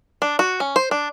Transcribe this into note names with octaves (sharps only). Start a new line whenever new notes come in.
D4
F#4
C#4
C5
D4